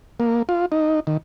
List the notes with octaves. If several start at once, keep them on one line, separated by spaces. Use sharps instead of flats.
A#3
F4
D#4
D#3